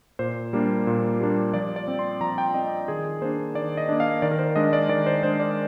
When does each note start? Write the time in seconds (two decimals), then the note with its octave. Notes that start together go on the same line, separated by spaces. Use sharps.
0.19 A#2 C5
0.53 G3 A#3 D4
0.87 A#2
1.20 G3 A#3 D4
1.54 F3 D5
1.76 D5
1.88 C4
1.99 C6
2.21 F3 A#5
2.38 G5
2.54 C4 D#5
2.88 D#3 G#4
3.22 A#3 D4 C5
3.55 D#3 D5
3.77 D#5
3.89 A#3 D4
4.00 F5
4.22 D#3 D5
4.31 A#4
4.39 C5
4.56 G#3 D4 D#5
4.73 D5
4.89 D#3 D5
5.06 C5
5.23 G#3 D4 C5
5.40 D5